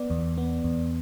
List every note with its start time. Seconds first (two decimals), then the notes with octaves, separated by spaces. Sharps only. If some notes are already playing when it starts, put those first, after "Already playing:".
Already playing: B3 D5
0.10 E2
0.37 B3
0.64 E2